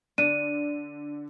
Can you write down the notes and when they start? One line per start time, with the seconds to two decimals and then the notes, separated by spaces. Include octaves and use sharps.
0.18 D3 D4 D#7